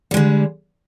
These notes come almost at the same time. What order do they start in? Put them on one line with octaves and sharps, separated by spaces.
G3 G#3 D3